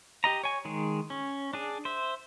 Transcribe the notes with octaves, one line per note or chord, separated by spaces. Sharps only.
G4 D#5 A#5
C#5 G#5
D#3 G#3 G#4
C#4
D4 G#4
C5 E5